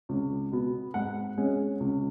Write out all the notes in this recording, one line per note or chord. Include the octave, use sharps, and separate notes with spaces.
C#2
B2 B3
G#2 F#5
G#3 C#4
C#2